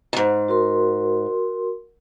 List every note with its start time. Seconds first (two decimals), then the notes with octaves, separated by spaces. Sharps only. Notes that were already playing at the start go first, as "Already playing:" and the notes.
0.13 D#2 G#2
0.48 F#4 A#4 C6